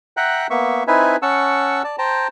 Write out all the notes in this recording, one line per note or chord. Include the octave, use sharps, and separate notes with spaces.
E5 F#5 G5 A#5 F#6
A#3 B3 E5 C#6
C4 D#4 E4 B4 E5 G#5
C#4 F#5 A5 C#6 E6
D5 A5
C5 G5 A5 A#5